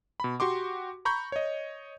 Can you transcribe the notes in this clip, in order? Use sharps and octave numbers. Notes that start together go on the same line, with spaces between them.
B2 B5
F#4 G4 C6 D6
A#5 B5 C#6 G6
C#5 D#5